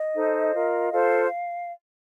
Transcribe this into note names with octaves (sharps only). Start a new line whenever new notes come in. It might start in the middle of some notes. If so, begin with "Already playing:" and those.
Already playing: D#5
D#4 A4 C5
F4 A#4
F4 A4 C5 F5